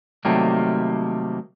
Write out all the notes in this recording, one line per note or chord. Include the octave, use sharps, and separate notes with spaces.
C3 D#3 F#3 G3 A3 A#3